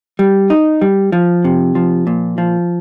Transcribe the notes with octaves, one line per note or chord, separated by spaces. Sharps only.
G3
D#4
G3
F3
C3
F3
A#2
F3